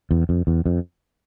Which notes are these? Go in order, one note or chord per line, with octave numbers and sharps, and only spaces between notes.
E2
F2
E2
F2